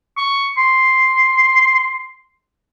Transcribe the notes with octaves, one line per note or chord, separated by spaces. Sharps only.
C#6
C6